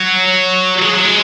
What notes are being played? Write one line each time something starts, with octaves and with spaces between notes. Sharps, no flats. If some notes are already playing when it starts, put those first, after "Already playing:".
Already playing: F#3
G#3
F#3
G#3